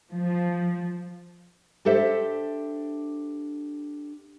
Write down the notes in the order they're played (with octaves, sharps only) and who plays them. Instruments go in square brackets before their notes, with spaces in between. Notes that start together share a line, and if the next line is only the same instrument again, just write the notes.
[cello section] F3
[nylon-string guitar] D4 G4 A4 C5 E5